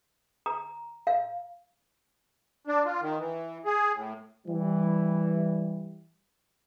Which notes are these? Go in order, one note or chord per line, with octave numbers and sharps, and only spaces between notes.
A#5
F5
D4
F4
D#3
E3
G#4
A2
E3 G3